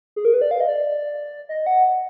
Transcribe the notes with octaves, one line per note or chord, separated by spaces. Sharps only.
G#4
A#4
B4
D5
F5
D#5
D5
D#5
F#5